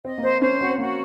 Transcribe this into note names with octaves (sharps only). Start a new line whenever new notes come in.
C4 D#5
A#3
C4 C5
C#4 C5
C4 F#4
A#3 F#4